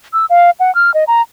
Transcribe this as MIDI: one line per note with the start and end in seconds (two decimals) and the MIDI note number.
0.13 0.26 88
0.30 0.50 77
0.60 0.73 78
0.75 0.93 89
0.94 1.04 75
1.07 1.22 82